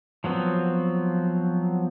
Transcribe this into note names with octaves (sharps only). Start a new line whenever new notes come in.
F3 F#3 B3 C4